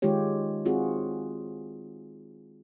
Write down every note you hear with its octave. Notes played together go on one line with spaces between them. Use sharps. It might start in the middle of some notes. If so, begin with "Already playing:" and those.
D#3 G#3 D#4 F4 G4 C#5
C4 F4 F#4 G#4